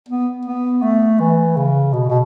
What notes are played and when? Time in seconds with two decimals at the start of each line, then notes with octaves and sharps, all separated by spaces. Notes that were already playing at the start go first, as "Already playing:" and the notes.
0.08 B3
0.45 B3
0.82 A3
1.20 E3
1.57 C#3
1.93 B2
2.10 B2